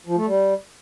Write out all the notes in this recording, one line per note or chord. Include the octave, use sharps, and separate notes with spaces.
F3
A3
G3